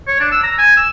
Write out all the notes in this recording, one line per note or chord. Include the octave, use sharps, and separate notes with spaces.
C#5
D4
E6
A#5
G#5
E6